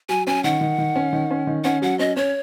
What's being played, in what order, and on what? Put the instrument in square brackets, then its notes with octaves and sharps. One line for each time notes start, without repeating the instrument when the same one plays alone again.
[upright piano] F#3 [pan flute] G#5
[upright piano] C#4 [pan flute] G#5
[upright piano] D#3 [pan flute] F#5
[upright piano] D#3
D#3
C#4
D#3
C#4
D#3
[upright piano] C#4 [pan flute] F#5
[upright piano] F#3 [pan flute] F#5
[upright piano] C#4 [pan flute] D#5
[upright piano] C#4 [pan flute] C#5